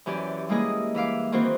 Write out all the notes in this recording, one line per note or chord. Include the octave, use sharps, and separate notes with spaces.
F#2 E3 C#4 G4 D5
G3 G#3 A#3 E4 G#4 D#5
E3 E5 F5 D6
D#3 E3 A#3 C4 F#4 C5